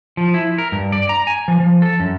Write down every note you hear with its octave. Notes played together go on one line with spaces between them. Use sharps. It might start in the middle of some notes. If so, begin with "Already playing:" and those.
F3
E4
A#4
G2
D5
A#5
G#5
F3
F3
A4
F#2